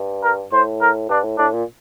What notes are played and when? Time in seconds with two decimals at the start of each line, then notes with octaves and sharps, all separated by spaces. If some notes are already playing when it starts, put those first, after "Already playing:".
Already playing: G2
0.23 A#4
0.52 A2 C5
0.81 A#4
1.09 G2 D4
1.24 A2
1.38 A2 D4
1.53 A#2